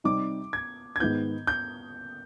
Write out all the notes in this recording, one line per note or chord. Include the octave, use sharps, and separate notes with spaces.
C3 G3 C4 D#4 D6
G#6
G#6
G#2 D#3 B3 G6
G6